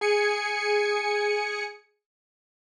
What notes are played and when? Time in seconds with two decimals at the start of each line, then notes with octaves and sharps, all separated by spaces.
0.01 G#4 G#5 C#7